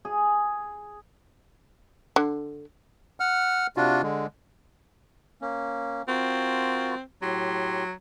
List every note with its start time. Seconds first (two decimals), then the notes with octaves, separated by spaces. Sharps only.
0.05 G#4
2.16 D3
3.20 F#5 F6
3.77 C3 D4 F4 F#4
4.02 D3 G#3
5.42 A#3 C#4
6.08 C4 F4 F#4 A#4
7.22 A2 F#3 G4 C6